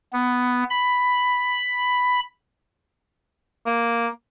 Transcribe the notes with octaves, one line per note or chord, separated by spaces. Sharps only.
B3
B5
A#3